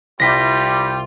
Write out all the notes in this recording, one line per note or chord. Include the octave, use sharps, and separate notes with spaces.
C2 G3 F4 G4 A5 A#6 B6